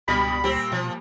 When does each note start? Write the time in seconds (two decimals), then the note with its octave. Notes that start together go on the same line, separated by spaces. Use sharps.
0.08 C#2 G2 B2 G3 B5 D#6
0.44 A#2 G3 C4 G4
0.72 B2 F3